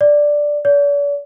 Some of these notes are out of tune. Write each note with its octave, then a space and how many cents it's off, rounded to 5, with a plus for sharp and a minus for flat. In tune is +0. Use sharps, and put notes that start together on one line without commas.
D5 +0
D5 -45